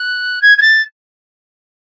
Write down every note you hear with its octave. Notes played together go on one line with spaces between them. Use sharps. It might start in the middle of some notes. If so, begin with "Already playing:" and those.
Already playing: F#6
G#6
G#6
A6